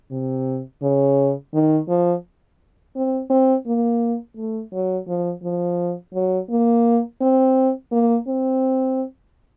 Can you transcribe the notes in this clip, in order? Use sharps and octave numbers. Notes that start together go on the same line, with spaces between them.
C3
C#3
D#3
F3
C4
C4
A#3
A3
F#3
F3
F3
F#3
A#3
C4
A#3
C4